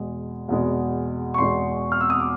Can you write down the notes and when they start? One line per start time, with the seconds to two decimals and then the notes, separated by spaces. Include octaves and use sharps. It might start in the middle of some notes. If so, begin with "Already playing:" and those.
Already playing: E2 B2 G#3
0.48 E2 B2 G#3
1.34 C#6
1.38 E2 B2 G#3 C6
1.92 F6
2.01 E6
2.10 D#6
2.20 D6